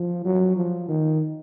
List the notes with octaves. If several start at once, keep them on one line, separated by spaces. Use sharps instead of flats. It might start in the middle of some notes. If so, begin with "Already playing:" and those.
Already playing: F3
F#3
F3
D#3